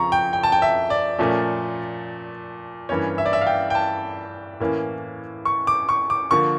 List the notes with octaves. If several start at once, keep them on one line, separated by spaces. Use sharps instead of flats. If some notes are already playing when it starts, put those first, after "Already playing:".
Already playing: F2 C#3 F3 A#5 C#6
G5
G5
A5
G5
E5
D5
A#2 F3 A3 C#4
G2 E3 A#3 C#4 C#5
E5
D5
E5
F5
G5
G5
A5
A2 E3 A#3 C#4
C#6
D6
C#6
D6
D3 F3 A#3 C#6